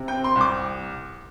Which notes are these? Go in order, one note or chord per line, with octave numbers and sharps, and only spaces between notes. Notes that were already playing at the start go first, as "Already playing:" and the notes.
Already playing: C3
G5
C4
C6
C2
D6